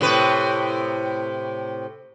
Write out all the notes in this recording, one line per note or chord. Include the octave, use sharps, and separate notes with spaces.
A2 C3 B4